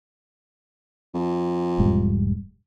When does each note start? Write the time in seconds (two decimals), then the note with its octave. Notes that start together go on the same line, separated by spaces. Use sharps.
1.14 F2
1.79 E1 G#2 G3